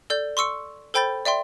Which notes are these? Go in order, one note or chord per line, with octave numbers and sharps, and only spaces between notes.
A4 D5 G6
C6 C#6 E6 C#7
A4 C5 G5 B5 G6 A6
D5 E5 G5 C6